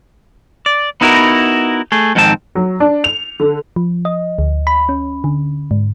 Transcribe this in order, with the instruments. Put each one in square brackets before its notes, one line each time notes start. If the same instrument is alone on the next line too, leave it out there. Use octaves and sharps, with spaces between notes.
[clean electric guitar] D5
B3 D#4 E4 F#4 A4 A#4
A3 G#4
F2 G#2 D#3 C4 A5
[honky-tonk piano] F#3
D4
F7
D3
[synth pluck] F3
D#5
D2
B5
C#4
D3
G#2